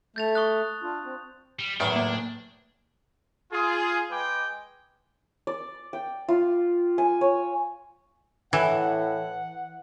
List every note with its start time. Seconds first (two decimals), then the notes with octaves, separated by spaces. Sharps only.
0.16 A3 G6 A6 F7
0.35 C#6 D#6 F#6
0.83 D4 F4
1.05 C4
1.59 G3
1.80 E2 A2 D#3 F#3 D4 E5 B5 C#6
1.96 A#3
3.52 F4 G#4
4.10 G#3 B4 D#5 G5 G#5 D6
5.47 D5
5.93 G5
6.29 F4
6.98 G#5
7.21 C#5
8.53 A2 E3 F#5